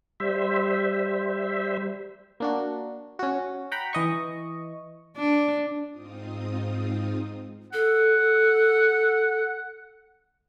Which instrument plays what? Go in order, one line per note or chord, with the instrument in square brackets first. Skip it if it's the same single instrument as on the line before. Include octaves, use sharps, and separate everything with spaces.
[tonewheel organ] G3 C5 E5
[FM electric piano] A#3 D4 F#4
C#4 F#4
F#5 G5 A#5 B5
E3 D#5 C#6
[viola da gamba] D4
[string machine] G#2 C4 D#4 F4 D#6
[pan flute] A4 [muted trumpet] F#5